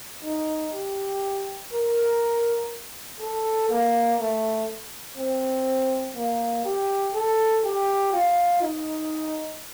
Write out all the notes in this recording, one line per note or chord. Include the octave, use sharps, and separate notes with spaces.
D#4
G4
A#4
A4
A#3
A3
C4
A#3
G4
A4
G4
F4
D#4